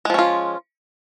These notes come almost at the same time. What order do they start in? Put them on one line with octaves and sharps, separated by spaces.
G#3 F3 C#4 F4